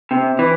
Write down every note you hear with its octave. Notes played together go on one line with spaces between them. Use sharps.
C3
E3